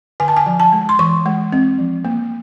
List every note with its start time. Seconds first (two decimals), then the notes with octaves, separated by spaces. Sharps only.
0.20 D3 G#5
0.28 A5
0.37 G#5
0.46 F3
0.60 A5
0.73 G#3
0.89 C6
0.99 E3 C#6
1.26 G#3
1.52 C4
1.78 F3
2.05 A#3